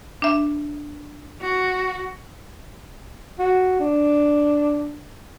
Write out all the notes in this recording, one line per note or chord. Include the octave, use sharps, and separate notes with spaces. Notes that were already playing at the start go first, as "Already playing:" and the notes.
D4 E5
F#4
F#4
D4